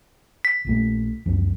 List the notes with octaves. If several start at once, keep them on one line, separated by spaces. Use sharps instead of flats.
B6
A#1 A#2 A3
C#2 F#2 F3